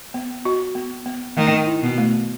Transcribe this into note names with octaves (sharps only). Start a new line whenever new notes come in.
B3
F#4
B3
B3
D#3 A3
E4
B2
A3